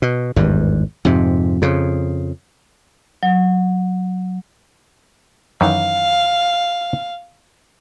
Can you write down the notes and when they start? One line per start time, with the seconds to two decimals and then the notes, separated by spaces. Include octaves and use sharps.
0.02 B2
0.36 G#1 E2 G2
1.05 F2 G#2 C3
1.62 F2 C#3
3.23 F#3
5.61 F#2 D#3 E3 F5